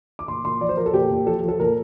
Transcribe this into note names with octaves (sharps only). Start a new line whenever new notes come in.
D6
A#2 C6
A#2 C6
F3 D5
C5
F3 A#4
A4
A#2 G4
A#2
F3 A4
F3
A4
A#2 A#4